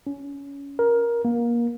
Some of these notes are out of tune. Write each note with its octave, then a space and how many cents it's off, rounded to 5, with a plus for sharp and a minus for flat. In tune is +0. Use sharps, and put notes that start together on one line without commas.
C#4 +20
A#4 +15
A#3 +25